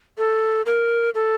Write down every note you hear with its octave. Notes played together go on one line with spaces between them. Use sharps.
A4
A#4
A4